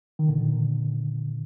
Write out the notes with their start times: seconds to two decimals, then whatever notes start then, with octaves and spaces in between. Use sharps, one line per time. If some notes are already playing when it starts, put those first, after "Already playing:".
0.19 D#3
0.28 A#2 D3